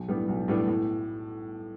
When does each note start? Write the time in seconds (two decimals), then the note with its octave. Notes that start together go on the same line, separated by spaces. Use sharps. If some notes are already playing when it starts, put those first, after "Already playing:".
Already playing: B1
0.08 A2 G3 B3 D4
0.29 B1
0.48 A2 G3 B3 D4
0.68 A2